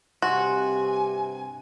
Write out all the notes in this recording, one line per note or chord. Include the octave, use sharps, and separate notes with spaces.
G2 C3 F#4 G#5 C6